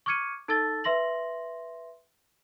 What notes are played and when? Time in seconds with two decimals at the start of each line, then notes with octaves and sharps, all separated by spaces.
0.06 C#6 D6 F6 G#6 C#7 D#7
0.48 D#4 A4 A5 E6 A6 G7
0.84 B4 E5 C6 A#6 F#7